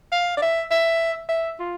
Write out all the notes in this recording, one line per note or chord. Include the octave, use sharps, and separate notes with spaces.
F5
D5
E5
E5
E5
F4